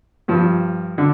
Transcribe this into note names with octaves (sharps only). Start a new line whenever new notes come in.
G2 F3
D3